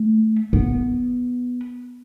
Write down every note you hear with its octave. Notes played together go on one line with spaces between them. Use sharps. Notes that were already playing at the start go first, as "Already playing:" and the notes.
Already playing: A3
B3